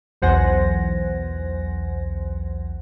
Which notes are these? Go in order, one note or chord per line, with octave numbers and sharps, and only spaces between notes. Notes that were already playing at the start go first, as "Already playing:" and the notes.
B1 E2 C5 F#5 G#5 A#6